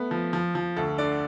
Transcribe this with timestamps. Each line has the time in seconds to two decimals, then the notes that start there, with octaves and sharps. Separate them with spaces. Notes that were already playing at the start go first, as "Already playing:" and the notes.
Already playing: A3 B3
0.11 F3
0.33 F3
0.55 F3
0.77 D2 A4
0.98 D3 D5